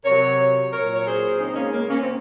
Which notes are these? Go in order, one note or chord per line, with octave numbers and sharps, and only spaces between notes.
C3 F#3 A#4 C#5
A#2 F#3 A#4 C#5
C#5
G#4 C5
C#3 G#3 C4 D#4
A#3 C#4
A#3
A#3 C#4
C4